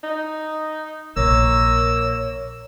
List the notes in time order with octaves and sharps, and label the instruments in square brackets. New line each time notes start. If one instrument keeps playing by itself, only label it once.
[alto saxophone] D#4
[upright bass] A#1 [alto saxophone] A#3 [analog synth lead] C#5 [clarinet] E6